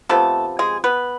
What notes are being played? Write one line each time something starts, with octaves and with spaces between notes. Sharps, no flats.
C3 F3 A3 B3 A4
G#3 G#4
B3 B4